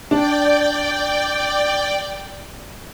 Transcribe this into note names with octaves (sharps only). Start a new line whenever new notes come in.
D4 D5 G5